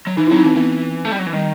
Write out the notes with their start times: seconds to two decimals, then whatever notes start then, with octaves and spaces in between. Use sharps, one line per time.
0.07 F#3
0.17 E3 D#4
0.27 E4
0.31 F#3 C4
0.37 D#4
0.43 E3 C4
0.56 E3 B3
1.05 A3
1.12 G3
1.19 F#3
1.27 E3
1.33 D#3 G3